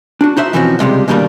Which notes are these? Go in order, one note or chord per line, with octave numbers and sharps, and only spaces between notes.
D4 F#4
D#4 F#4 C5 E5
B2 E3 F3 C4 C#4 F#4
C#2 C3 G3 G#3
G#2 B2 D#3 G3 A#3 D4